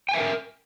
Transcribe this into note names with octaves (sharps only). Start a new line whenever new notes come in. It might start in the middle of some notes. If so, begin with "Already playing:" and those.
A#4 B4 E5 G5 G#5